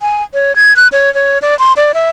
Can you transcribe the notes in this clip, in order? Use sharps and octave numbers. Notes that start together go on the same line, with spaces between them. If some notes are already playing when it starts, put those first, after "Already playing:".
G#5
C#5
G#6
F#6
C#5
C#5
D5
C6
D5
E5